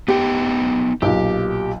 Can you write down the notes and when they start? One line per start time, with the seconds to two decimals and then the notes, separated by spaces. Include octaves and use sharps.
0.08 B3 D#4 G4 G5
1.02 B1 A#2 G4